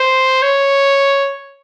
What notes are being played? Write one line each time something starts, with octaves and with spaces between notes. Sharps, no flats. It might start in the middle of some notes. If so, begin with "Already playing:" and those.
Already playing: C5
C#5